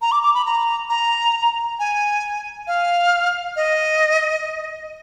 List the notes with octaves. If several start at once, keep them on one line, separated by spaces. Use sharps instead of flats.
A#5
D6
D6
B5
A#5
A#5
G#5
F5
D#5